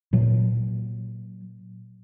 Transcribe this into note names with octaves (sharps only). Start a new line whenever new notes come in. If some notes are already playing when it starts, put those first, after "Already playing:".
A#2 F#3